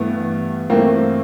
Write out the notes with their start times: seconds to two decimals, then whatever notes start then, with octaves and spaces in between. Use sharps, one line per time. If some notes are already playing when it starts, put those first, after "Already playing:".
Already playing: G2 E3 A3 B3
0.70 G2 E3 A3 A#3 C4